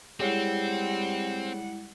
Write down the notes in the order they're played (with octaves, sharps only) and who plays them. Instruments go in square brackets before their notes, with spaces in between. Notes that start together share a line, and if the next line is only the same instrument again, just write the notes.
[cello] G3 F#5 [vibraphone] G#3 E4 [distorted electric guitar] C4 [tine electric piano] G4 G#4 C#5